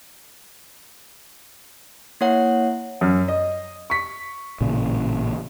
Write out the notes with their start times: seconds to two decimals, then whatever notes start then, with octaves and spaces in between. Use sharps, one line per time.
2.21 A#3 E4 C#5 F#5
3.01 F#2
3.28 D#5
3.90 C#6 B6
4.61 A1 A#2 C#3